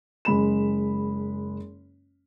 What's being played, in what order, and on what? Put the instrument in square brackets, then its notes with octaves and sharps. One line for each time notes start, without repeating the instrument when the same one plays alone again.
[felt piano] F#1 G#3 B5 E7